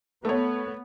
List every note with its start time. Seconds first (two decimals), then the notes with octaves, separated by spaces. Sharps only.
0.25 A3 B3 C#5